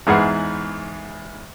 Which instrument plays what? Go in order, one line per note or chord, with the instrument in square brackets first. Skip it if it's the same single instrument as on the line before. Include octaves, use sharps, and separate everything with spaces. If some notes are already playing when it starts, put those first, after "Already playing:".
[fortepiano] E2 G#2 G#4 B4 F#5 F6